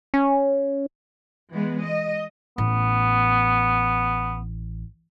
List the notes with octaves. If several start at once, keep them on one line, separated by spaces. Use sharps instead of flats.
C#4
E3 G#3 B3
D#5
A1 B3